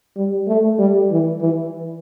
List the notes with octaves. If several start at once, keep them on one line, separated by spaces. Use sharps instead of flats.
G3
A3
G3
E3
E3